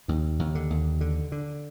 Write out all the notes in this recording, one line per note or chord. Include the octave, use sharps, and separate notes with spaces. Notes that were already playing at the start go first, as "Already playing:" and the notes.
D#2 D#3
D#2
D3
D#2
D3
D3